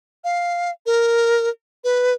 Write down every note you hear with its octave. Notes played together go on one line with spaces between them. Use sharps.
F5
A#4
B4